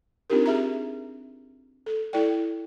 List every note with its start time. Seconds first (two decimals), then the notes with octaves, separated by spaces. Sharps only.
0.30 C4 D4 D#4 F4 G4 A#4
0.46 G#4 E5 A#5
1.86 A4
2.13 E4 A4 D5 G5